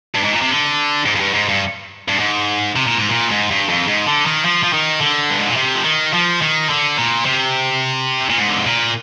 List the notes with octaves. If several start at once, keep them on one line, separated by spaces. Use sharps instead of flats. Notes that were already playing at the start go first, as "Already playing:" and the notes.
G2
G#2
A#2
C3
D3
G#2
F2
G2
G#2
G2
G2
G#2
C3
A#2
G#2
A#2
G2
G#2
G2
F2
G#2
D3
D#3
F3
F3
D#3
D3
G2
G#2
A#2
C3
F3
D#3
F3
D#3
D3
A#2
C3
A#2
G#2
D3
C3
A#2